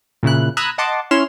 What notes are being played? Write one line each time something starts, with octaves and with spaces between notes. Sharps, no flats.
A#2 C#3 E4 F#6
A#5 B5 D#6 E6 F#6 G#6
D#5 F#5 A5 C6 D6
C#4 E4 C#5 C6 F6 E7